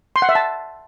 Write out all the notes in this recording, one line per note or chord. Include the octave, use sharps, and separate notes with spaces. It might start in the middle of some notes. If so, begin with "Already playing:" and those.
C6
F#5
E5
A5